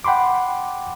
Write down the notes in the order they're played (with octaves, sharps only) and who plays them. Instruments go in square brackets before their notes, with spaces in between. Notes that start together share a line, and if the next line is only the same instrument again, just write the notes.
[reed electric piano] F#5 G5 B5 C6 D6